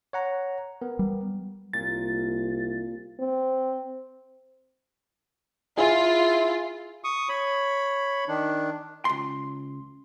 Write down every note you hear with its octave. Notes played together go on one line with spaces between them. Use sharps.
C#5 F#5 A#5
B3 A#4
G3
C2 A#2 A6
C4
E4 F4 G#4
C#6 D#6
C#5 B5
D#3 D4
C#2 C6